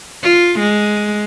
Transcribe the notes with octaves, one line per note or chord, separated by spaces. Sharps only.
F4
G#3